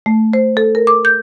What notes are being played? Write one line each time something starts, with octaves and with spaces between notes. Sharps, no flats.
A3
C5
A4
A#4
D6
G6